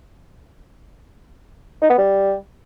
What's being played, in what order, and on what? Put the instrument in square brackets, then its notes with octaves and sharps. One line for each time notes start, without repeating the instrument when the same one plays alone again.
[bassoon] D#4
B3
G3